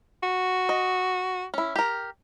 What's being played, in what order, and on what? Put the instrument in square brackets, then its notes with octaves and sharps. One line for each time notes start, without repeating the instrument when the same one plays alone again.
[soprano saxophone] F#4
[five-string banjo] D#5
C#4 E4
G4 A#4